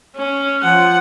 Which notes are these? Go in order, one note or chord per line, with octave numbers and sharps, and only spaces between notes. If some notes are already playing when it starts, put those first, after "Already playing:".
C#4
F3 F#5